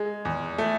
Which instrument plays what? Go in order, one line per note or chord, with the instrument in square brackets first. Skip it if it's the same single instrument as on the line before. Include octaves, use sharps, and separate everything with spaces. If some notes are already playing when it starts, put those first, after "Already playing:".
Already playing: [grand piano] G#3 [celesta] G#4
[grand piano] E2
[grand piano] A3 [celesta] A4